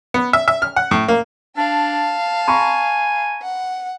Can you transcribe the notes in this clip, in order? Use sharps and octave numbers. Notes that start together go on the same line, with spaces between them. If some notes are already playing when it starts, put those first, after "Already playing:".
B3
E5
E5
F6
F#5
A2
A#3
D4 F5 A5
G#5 A#5 B5 C#6
F#5